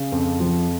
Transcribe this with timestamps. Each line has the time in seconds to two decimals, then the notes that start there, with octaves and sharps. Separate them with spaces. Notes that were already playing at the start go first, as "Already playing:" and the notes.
Already playing: C#3
0.12 F2
0.40 F3